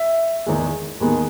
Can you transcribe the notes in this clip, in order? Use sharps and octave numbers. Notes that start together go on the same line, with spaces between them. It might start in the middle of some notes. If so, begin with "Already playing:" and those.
Already playing: E5
E2 D#3 G#3
D#2 D#3 G#3 B3